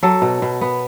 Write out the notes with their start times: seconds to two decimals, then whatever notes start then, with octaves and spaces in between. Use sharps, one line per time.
0.03 F#3 A4
0.22 B2
0.42 B2
0.61 B3